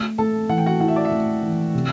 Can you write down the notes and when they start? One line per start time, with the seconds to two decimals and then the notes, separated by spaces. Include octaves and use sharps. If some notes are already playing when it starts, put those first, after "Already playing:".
Already playing: A3
0.18 A3 A4 A5
0.49 E3 F#5
0.58 G5
0.66 F#4 F#5
0.80 E4 F#5
0.88 E5
0.96 D5
1.05 E5
1.12 A3
1.42 E3
1.74 C3